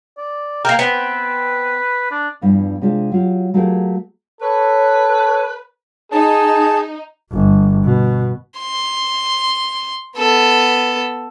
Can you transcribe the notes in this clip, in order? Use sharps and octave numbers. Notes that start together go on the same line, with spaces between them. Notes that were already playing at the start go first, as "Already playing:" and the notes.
D5
A#3 A#4 G5
B3 C4 B4
D4
E2 G2 E3 F3
C3 G#3 C4 D4 F4
F#3 F4 G4
F#3 A3 F4 G4 G#4 A#4
A4 B4 C#5
D#4 G#4 A5
G1
B2
C6
B3 A4